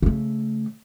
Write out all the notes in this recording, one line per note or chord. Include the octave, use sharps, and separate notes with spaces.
C#3 A3